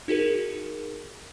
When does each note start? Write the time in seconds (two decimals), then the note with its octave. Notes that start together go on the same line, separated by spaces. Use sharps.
0.08 D#4 F#4 G#4 A#4